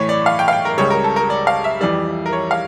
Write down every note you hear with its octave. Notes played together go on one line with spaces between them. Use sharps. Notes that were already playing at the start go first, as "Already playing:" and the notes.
Already playing: A2 E3 A3 C#5
D5
F5
G5
F5
G5
A#4
C#2 C#3 G3 C#5
A#4
A4
A#4
D5
F5
E5
F2 E3 G3 D5
A#4
C#5
F5